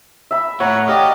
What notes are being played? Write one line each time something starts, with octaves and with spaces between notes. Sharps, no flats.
E5 B5
A2 C#5 F#5 A#5
G4 D5 D#5 F5